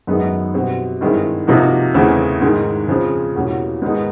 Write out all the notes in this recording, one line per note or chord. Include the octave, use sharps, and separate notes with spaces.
F#2 D#3 G#3 B3 D#4
B2 G3 C4
G2 D#3 G#3 C4 E4
C3 F3 A#3 D#4 F#4
E2 C#3 E3 A3 C4
G#2 D#3 G#3
C#3 F3 G#3 C4
E2 B2 G3 A#3 C#4
G#2 D#3 G#3 B3 D#4